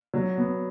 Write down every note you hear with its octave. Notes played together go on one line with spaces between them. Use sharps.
F#3
B3